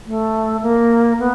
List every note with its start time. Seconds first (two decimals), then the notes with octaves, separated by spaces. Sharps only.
0.06 A3
0.62 A#3
1.19 B3